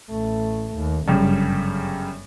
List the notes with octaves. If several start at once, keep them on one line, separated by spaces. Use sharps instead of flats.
A1 A3
D#2
G1 F#2 C#3 G3